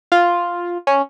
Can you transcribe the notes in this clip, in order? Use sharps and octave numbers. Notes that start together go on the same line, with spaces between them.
F4
C#4